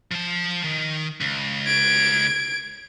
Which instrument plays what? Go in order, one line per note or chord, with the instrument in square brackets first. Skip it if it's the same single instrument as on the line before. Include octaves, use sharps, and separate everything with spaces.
[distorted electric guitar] F3 A5
D#3
C#2
[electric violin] G#6 D7